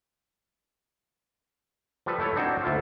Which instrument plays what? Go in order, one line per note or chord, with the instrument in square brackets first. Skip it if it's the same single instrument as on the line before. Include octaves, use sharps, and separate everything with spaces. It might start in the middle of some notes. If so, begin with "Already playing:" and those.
[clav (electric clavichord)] F3 G3 A4 B4
A3 E4 A4 C#5
C4 D4 D#4 F#4 A4 C5
D2 E4 F4